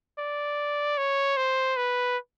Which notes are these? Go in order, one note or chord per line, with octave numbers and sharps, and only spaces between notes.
D5
C#5
C5
B4